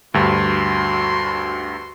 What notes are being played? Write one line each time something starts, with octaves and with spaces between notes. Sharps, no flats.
D2 G2 F#4 C6